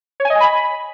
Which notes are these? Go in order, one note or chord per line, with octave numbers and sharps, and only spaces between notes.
C#5
G#5
D#5
G#5
B5